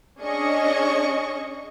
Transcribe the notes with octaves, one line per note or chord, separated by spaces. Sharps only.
C#4 D4 G#4 D#5 C#6